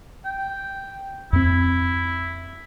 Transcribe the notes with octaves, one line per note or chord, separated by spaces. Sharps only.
G5
F2 C4 E4